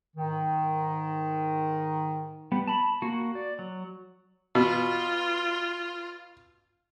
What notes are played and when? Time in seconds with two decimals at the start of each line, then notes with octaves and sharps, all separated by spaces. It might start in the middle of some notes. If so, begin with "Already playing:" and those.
0.16 G#2 D#3
2.52 G3 B3
2.68 A5 B5
3.02 A#3 F#4
3.35 D5
3.59 F#3
4.55 B2 F4